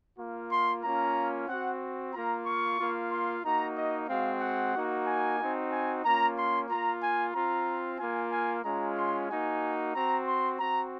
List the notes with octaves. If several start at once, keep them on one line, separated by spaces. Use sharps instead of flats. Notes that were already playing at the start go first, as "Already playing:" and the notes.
A#3 F4
C6
A#3 C#4 F4 A#5
C4 F#4 F#5
A#3 F4 A#5
C#6
A#3 F4
C6
A#3 D#4 F#4 A#5
D#5
G#3 C4 F#4 F5
F#5
A#3 D#4 F#4
G#5
C4 D#4 F#4
G#5
A#3 C#4 F4 A#5
C6
A#3 F4 A#5
G#5
C4 F4 A#5
A#3 F4 G#5
G#5
G#3 C#4 F4 A#5
C6
A#3 D#4 F#4 G#5
C4 F#4 A#5
C6
C4 F#4 A#5